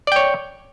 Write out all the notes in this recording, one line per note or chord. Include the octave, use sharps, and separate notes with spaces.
C#5 D5 G5